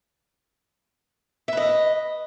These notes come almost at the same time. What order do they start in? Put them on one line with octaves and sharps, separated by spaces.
E5 B4 D#5